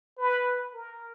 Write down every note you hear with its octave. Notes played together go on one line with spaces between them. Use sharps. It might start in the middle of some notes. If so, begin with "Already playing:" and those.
B4
A#4